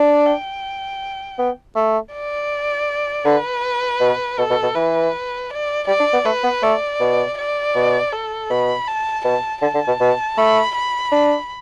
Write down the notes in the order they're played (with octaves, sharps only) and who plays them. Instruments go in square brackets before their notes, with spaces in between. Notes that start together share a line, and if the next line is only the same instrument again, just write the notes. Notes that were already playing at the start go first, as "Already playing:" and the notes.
Already playing: [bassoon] D4 [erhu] D5
[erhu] G5
[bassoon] B3
A3
[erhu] D5
[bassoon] D3 [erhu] B4
[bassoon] B2
[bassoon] B2 [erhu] A4
[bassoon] B2
B2
[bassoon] E3 [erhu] B4
[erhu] D5
[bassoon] G3 [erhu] D5
[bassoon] D4
B3
[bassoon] A3 [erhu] B4
[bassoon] B3
[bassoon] A3 [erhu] D5
[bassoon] B2
[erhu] D5
[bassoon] B2
[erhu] A4
[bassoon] B2 [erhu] B5
[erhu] A5
[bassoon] B2 [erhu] A5
[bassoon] D3 [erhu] A5
[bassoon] D3
B2
B2
[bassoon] A3 [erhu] B5
[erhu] B5
[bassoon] D4